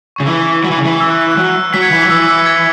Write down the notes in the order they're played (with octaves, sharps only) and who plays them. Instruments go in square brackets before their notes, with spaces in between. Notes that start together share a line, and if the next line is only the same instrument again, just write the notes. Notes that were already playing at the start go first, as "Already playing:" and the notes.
[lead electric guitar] C#3 [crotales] C#6
[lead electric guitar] E3 [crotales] E6
[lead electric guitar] F#3
E3
C#3
E3
[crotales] E6
F#6
E6
F#6
[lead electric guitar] F#3 [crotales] E6
[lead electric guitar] F#3 [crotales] B6
[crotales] G#6 C#7
[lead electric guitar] E3 [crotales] B6
[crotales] B6
[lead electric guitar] F#3
[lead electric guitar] E3 [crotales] E6
[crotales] E6
G#6